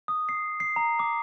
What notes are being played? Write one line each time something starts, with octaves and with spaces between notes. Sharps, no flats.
D#6
C7
C7
A#5
D6